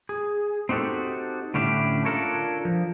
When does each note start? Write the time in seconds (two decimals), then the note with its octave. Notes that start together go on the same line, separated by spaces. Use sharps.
0.09 G#4
0.69 C4 D#4 F#4 G4 A4
1.54 A2 D3 C#4 D4 E4 G4
2.05 D4 F4 A4 A#4 C#5
2.65 F3